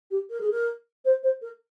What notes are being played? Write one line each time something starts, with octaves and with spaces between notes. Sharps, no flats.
G4
A#4
G#4
A#4
C5
C5
A#4